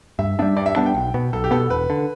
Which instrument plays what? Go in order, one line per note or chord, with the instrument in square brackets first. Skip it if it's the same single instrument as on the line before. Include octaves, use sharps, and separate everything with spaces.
[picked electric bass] G2 [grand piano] E5
[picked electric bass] B3 D4 [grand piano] E5
[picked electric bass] G3
[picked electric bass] G2 [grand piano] D5
[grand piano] E5
[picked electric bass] G3 B3 D4 [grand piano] A5
[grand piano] G5
[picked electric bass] B1
B2 B3
[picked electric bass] B1 [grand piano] A4
[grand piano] G4
[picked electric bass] B2 B3 [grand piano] A4
[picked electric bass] E1 [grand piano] B4
[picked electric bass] D3